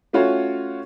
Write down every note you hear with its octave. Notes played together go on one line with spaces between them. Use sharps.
A3 C#4 F4 F#4 C#5